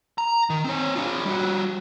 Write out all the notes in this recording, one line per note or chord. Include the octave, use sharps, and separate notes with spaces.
A#5
D#3
C4 C#5
D4 F4
G3 F#4